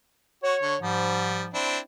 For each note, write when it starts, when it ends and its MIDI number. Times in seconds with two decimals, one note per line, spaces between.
0.43 0.55 66
0.43 0.75 73
0.62 0.75 50
0.62 0.75 85
0.82 1.51 44
0.82 1.51 53
0.82 1.43 55
1.54 1.78 60
1.54 1.78 62
1.54 1.78 64